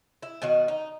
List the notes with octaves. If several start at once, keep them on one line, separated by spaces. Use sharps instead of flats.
E4
B2 D#3 F#4
D#4